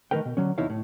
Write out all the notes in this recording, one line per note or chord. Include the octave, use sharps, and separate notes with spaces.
D#3 G#3 A3 A#4 B4 G5
B2
D3 F#3 C#4
E2 C3 D#4 E4 C#5 F5
A2